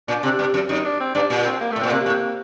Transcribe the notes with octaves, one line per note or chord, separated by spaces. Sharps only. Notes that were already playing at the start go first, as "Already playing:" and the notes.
A#2 D4
C3
G2
F#2
F#2 D#4
D4
C4
G2 D4
A#2
C4
A#3
A3
A2
A#2 C4
C3 A#3
A2